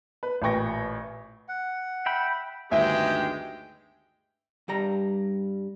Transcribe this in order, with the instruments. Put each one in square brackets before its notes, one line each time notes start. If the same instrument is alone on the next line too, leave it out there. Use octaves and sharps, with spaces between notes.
[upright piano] B4
A1 A#2 B4 G5 C#6 A#6
[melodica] F#5
[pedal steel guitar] E5 G5 B5
[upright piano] G1 D2 D#3 [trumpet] G#3 [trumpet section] G4 G5 [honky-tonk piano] E5
[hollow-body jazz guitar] G2 G3 A#5